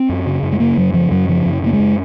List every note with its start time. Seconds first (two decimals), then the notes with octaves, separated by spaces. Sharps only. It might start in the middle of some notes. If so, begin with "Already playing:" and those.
Already playing: C4
0.09 F#2
0.26 C#3
0.43 F#2
0.52 G#3
0.60 C#3 A#3
0.77 F#2 F#3
0.94 C#3 F3
1.11 F#2 F#3
1.28 C#3 F3
1.46 F#2
1.63 C#3 A#3
1.73 G#3
1.79 F#2